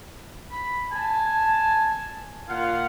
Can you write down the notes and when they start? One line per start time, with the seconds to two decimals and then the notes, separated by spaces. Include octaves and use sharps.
0.51 B5
0.92 G#5 A5
2.48 A#2 F4 F5 F#5